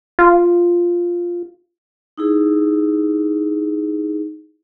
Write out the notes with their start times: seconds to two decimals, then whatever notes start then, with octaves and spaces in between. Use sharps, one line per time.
0.19 F4
2.18 D#4 E4 G#4